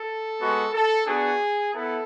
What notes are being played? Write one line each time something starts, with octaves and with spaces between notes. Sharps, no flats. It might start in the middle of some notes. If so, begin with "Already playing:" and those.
Already playing: A4
G#3 B3 F#4
A4
B3 D4 F#4 G#4
B3 E4 A4